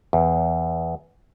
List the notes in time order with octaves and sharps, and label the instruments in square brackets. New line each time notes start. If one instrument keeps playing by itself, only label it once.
[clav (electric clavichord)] E2